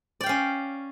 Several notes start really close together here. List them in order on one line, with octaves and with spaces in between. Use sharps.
D5 G5 F5 C#4